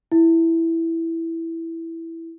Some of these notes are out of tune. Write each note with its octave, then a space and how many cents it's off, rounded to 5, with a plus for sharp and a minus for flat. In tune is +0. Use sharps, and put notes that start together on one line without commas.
E4 +0